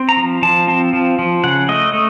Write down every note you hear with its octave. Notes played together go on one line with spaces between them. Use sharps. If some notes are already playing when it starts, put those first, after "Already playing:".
Already playing: C4
A#5
F3
F3 A5
C4 A5
F3
F3
C#3 F#5
A3 D#5
A3